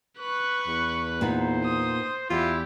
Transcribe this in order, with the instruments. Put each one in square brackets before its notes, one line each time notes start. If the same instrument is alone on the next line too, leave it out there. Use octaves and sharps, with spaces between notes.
[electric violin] B4 F#6 [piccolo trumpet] C#6
[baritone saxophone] E2
[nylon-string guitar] A#2 B3 D#4 [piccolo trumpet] C5
[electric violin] D#6
[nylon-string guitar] E2 [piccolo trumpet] E4 [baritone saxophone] F4 [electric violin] G4